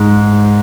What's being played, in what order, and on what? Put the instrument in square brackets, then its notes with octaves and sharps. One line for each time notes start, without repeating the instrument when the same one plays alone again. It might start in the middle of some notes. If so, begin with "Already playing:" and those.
Already playing: [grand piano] G#2